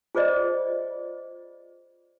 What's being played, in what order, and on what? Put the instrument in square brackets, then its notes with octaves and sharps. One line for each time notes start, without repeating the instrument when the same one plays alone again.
[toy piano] F4 G#4 C5 D5 D#5